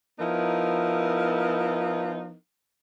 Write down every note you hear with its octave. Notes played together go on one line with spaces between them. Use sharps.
F3 B3 D#4 E4 A#4